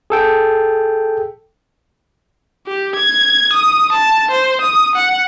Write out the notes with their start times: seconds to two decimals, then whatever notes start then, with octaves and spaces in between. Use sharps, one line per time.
0.10 G#4 A4 G5
2.67 G4
2.96 G#6
3.53 D#6
3.92 A5
4.31 C5
4.61 D#6
4.96 F#5